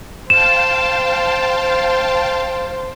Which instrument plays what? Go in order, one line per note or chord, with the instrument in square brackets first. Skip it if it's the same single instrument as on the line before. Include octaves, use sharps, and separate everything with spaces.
[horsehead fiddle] C5 [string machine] F5 G5 A5 [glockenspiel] E7